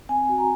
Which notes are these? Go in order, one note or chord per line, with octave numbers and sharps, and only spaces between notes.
C4 G#5
F#4
A#5